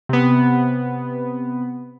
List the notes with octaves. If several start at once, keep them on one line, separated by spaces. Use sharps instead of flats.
C3 B3